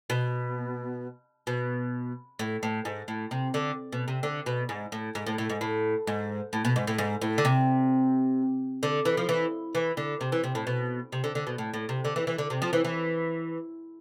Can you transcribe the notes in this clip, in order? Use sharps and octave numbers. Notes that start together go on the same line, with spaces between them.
B2
B2
A2
A2
G#2
A2
C3
D3
B2
C3
D3
B2
G#2
A2
G#2
A2
A2
G#2
A2
G#2
A2
B2
G#2
A2
G#2
A2
D3
C3
D3
E3
F3
E3
E3
D3
C3
E3
C3
A2
B2
C3
D3
D3
B2
A2
A2
C3
D3
E3
E3
D3
C3
F3
E3
E3